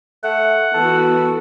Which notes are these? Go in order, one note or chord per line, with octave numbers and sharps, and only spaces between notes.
A3 F#5
E3 B3 F#4 A4